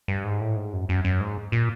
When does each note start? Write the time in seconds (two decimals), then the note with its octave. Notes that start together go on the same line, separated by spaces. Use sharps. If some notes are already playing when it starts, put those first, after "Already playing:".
0.08 G2
0.25 G#2
0.41 A2
0.56 G#2
0.73 F#2
0.89 F#2
1.05 F#2
1.21 G#2
1.52 A#2